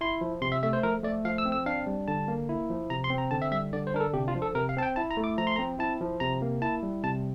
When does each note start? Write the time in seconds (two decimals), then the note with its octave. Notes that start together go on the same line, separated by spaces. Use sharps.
0.01 E4 C6
0.21 F3
0.41 C3 C6
0.52 E5
0.63 A3 E5
0.73 C5
0.83 F3 A#4
1.03 A3 D5
1.25 F3 F5
1.38 E6
1.45 C4
1.52 E6
1.66 D4 F5
1.87 G3
2.08 D3 A5
2.28 A#3
2.49 E4
2.70 F3
2.90 C3 A#5
3.04 C6
3.10 C4
3.18 A#5
3.31 D3 A5
3.42 E5
3.52 G3 E5
3.73 D3 D5
3.87 C5
3.94 D4 A#4
4.00 A4
4.14 C3 G4
4.28 F4
4.35 F3
4.42 A4
4.55 C3 A#4
4.69 F5
4.77 C4 A5
4.83 G5
4.96 E4 A5
5.11 A#5
5.17 A3
5.24 D6
5.37 F3 A#5
5.47 C6
5.56 A#5
5.59 C4
5.79 E4 A5
6.01 F3
6.20 C3 A#5
6.42 A#3
6.62 E4 A5
6.83 G3
7.03 C3 A5